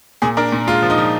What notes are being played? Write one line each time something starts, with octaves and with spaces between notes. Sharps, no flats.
A#2 G#4
D4 A#4
A#2
G#3 F4
F3
D#4
F3